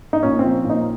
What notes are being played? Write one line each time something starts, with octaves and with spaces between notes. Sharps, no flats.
D#4
A#2 C#4
F3 C4
A#2
D#4